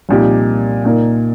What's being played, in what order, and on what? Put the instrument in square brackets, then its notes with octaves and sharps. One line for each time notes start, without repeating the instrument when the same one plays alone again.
[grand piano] C2 A#2 F3 D#4 G4
A#2 A#3 D#4 A#4